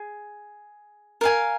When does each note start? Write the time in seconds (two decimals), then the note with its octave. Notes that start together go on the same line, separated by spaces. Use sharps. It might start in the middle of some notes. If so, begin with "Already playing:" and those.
Already playing: G#4
1.21 A#4 F5 G#5